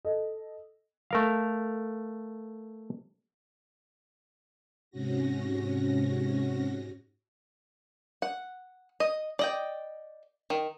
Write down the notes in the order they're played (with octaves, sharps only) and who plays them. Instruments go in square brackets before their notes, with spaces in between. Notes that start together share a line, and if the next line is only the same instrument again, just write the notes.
[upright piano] A4 D#5
[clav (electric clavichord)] A3 A#4 F5
[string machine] G#2 C3 C#4 F#4 A#6
[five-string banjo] F#5
D#5
D5 D#5 G5
D#3